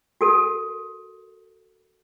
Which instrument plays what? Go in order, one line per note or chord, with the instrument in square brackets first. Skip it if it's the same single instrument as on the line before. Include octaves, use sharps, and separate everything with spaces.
[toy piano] F#4 A4 A#4